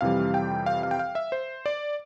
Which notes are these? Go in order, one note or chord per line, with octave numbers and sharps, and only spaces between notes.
F2 C3 E3 G3 F5
G5
F5
F5
G5
F5
E5
C5
D5